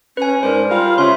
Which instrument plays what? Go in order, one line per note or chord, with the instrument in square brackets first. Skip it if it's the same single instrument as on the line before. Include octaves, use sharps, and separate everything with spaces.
[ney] C#4 [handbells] B4 G#5
[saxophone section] G#2 D4 [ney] A#4 [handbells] C5
[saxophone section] G3 A#4 F5 [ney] F4
[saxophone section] C#3 C#4 [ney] F4 [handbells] E5 C6